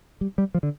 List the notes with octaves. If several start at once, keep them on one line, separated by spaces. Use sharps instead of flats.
G3
G3
F3
D3